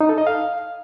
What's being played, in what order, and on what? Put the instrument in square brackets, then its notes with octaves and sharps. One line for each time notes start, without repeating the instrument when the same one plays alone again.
[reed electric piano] D#4
A4
D#5
F5